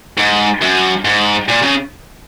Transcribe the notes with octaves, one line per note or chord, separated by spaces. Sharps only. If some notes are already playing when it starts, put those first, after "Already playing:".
G#2
F#2
G#2
A#2
C#3